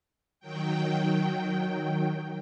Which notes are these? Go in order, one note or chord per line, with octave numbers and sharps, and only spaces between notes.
D#3 F#3 G5